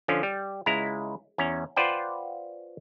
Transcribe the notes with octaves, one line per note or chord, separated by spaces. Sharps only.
D3 F3 C#4
G3
C#2 G#3 E4 A#5
E2 C#4 A#5
F4 B4 C5 D5 F#5 G5